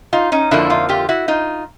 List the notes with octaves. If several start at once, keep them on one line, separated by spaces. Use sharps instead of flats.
D#4 F4
C#4 D#4
F2 D3 F3 A#3 D4 E4
D#4 F4
F4 G4
E4 F#4
D#4 F4